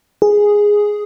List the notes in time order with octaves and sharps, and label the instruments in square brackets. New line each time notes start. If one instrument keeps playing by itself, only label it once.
[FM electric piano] G#4